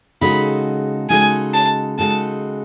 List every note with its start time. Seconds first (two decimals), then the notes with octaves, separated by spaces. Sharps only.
0.21 C#3 G#3 D#4 F#4 A4 B5
1.09 C#3 G#3 D#4 F#4 A4 G#5
1.54 A5
1.98 C#3 G#3 D#4 F#4 A4 A5